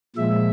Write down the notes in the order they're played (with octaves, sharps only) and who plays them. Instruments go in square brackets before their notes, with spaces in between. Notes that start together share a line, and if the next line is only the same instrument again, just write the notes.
[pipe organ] A#2 F3 G#3 E5